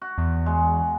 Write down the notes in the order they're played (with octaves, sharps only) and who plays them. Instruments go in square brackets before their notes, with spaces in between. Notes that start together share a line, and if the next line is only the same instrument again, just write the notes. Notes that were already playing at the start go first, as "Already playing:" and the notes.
[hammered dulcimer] F#4
[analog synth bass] E2
[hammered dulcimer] G#3 F#5